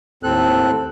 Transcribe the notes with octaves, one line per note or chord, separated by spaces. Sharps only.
D#2 A2 C4 A4 F#6